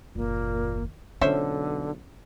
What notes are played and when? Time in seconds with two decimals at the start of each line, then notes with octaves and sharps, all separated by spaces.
0.15 F#1 D#2 A#2 A#3
1.21 B1 D3 C#4 F4 C5 E5